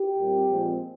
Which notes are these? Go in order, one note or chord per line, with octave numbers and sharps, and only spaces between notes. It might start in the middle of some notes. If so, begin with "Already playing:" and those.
Already playing: G4
A#2 G3 C4
A#2 F3 G#3 C4